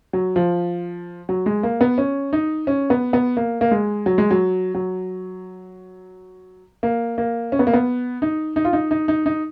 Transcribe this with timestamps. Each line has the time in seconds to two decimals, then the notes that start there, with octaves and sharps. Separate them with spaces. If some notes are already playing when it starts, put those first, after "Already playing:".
0.13 F#3
0.36 F3
1.29 F#3
1.46 G#3
1.63 A#3
1.81 B3
1.98 C#4
2.33 D#4
2.67 C#4
2.90 B3
3.13 B3
3.37 A#3
3.61 A#3
3.71 G#3
4.06 F#3
4.18 G#3
4.31 F#3
4.75 F#3
6.83 A#3
7.18 A#3
7.52 C#4
7.59 B3
7.67 A#3
7.73 B3
8.22 D#4
8.56 D#4
8.65 F4
8.73 D#4
8.91 D#4
9.08 D#4
9.26 D#4